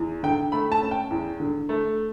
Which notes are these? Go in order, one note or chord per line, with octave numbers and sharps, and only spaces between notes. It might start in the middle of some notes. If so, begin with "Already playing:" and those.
Already playing: E2
D3 G5
A3 B5
A5
C#4
G5
E2
D3
A3